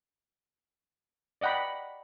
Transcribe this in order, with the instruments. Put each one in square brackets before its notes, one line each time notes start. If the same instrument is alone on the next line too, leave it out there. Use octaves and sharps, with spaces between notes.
[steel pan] D5 D#5 F#5 G5 B5